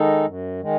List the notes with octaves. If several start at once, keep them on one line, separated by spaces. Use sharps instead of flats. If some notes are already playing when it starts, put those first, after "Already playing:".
Already playing: D#3 G#3 D#4 A4
F#2
D#3 G#3